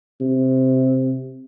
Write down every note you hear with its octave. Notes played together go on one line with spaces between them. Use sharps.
C3